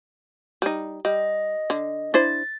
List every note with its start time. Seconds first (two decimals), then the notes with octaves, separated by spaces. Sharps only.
0.62 G3 D#4
1.05 G3 D#5
1.70 D3
2.14 D4 E4 C5 A6